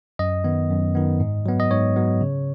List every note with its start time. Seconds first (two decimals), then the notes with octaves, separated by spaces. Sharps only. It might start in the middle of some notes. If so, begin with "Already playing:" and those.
0.19 F#2 D#5
0.44 D#3 B3
0.70 F#2
0.95 D#3 B3
1.20 G#2
1.46 F#3 B3
1.60 D#5
1.71 G#2 C#5
1.96 F#3 B3
2.21 C#3